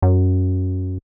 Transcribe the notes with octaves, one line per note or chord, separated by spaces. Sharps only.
F#2